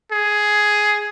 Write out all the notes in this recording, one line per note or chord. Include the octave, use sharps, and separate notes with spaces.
G#4